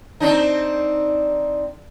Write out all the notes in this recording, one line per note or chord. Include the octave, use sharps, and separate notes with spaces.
C4 D4 D#4